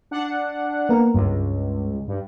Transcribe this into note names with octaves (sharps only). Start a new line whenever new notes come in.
D4 F#5
A#3 B3 A#4
C#2 G2
G2